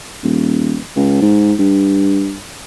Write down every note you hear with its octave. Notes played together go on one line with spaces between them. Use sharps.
D#1
C#2
G#2
G2